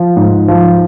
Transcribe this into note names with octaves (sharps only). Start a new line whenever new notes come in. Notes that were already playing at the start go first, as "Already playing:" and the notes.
Already playing: F3
G#2
F3